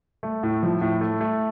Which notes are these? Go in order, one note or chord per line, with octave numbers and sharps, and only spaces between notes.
A3
A2
F3
A2
A3
A3